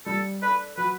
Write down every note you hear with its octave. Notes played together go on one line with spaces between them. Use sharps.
G3 A4
D4 A4 B4
F#3 B4